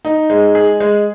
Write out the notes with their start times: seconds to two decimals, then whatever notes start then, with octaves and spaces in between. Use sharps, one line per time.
0.05 D#4
0.30 G#3
0.55 G#4
0.80 G#3